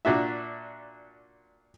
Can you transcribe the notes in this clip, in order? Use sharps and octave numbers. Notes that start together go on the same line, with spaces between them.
A#2 D4 F#4 E5